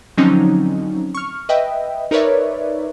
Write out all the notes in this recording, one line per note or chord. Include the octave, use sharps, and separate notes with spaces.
D3 F3 F#3 C4 C#4 D#4
C#6 F6
B4 D#5 E5 G5
D#4 A#4 B4 C#5 D5 E5